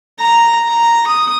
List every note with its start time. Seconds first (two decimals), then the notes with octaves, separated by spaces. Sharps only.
0.19 A#5
0.68 A#5
1.07 D#6